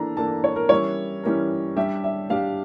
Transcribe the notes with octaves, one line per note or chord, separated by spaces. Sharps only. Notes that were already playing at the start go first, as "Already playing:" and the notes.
Already playing: E3 A#3 D4 A4 A#5
E3 A#3 D4 A4 A5
C#5
A#4
E3 G3 C#4 E4 A#4 C#5
E3 G3 C#4 E4 A#4
G3 D4 G4 E5
E5
G3 D4 G4 F5